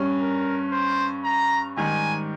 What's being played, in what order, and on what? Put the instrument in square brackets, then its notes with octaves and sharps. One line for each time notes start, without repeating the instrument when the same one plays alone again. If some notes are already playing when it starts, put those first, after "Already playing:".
Already playing: [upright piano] G2 G3 C#4
[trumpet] A#4
C5
A#5
[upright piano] G#2 D#3 G3 [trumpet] G#5